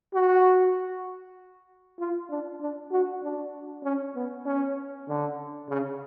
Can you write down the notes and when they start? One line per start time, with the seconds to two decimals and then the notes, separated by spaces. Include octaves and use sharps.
0.14 F#4
1.99 F4
2.30 D4
2.61 D4
2.92 F#4
3.23 D4
3.84 C#4
4.15 B3
4.46 C#4
5.08 D3
5.69 C#3